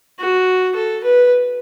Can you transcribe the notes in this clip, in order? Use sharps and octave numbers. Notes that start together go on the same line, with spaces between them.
F#4
A4
B4